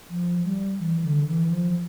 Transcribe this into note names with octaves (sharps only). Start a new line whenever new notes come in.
F3
G3
E3
D3
E3
F3